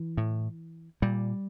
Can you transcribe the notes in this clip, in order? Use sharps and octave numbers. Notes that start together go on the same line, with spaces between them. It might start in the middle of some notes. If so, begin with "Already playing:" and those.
Already playing: E3
A2
A#2 G3